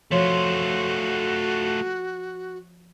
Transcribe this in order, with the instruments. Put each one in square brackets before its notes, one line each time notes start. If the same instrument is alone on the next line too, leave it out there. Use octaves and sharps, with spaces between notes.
[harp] F3 C#5 C6 [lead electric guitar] A3 F4 [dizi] F#4